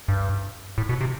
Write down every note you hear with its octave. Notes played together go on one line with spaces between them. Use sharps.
G2
A2
B2
C3